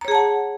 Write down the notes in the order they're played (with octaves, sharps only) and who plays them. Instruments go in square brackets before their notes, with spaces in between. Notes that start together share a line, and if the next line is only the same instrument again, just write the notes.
[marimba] A#5
C#5
G#4
A5
F#5